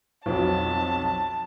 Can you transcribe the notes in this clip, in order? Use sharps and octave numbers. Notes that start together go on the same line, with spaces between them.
B1 F2 F#3 A5